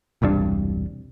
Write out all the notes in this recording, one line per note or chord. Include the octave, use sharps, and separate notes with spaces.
E1 C2 G2 D4